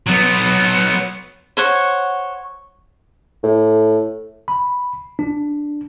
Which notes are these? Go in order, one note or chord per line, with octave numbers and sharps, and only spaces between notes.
F#3 B3
C5 C#5 F#5
A2
B5
D4